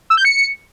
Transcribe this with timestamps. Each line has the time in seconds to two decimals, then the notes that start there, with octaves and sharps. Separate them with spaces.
0.10 E6
0.17 G6
0.25 C#7